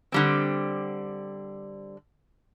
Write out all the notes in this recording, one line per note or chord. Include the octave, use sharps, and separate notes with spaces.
D3 G3 C4